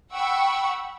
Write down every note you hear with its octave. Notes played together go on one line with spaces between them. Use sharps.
F#5 G5 B5 C#6 E6